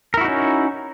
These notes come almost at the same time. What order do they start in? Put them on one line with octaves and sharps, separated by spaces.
A#4 E4 F#4 D#4 C#4